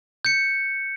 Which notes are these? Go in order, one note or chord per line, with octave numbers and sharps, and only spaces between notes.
G6 C#7